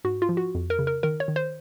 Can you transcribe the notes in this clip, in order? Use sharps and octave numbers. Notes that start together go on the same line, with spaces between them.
G#2 F#4
F4
F3
F#4
F2
A#4
C#3
A#4
D#3 A#4
C#5
D#3
C5